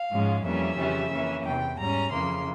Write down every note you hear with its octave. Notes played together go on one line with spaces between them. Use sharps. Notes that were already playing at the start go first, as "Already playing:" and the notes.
Already playing: F5
G#2 F3 G#3 C#4
F2 E3 G3 A#3 C#4 E5
F2 C#3 E3 G3 C#4
F2 E3 A#3 C#4
E2 C3 E3 G5
G#2 G3 C#4 A#5
F2 C#3 E3 A#3 C6